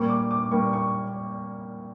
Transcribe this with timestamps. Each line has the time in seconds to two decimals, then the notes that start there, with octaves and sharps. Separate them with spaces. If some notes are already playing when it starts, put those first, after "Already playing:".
Already playing: A#2 G3 A#3 C#6
0.10 D6
0.31 D6
0.51 A#2 G3 A#3 C#6
0.73 C#6